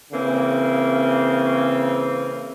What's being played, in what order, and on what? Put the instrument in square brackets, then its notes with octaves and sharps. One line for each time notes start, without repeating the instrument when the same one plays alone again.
[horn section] C#3 E3 A#3 C4